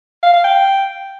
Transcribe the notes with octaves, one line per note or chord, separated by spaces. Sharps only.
F5
F5
G5